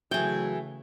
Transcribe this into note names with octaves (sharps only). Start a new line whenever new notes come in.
C#3 E3 F#3 A3 G#4 G5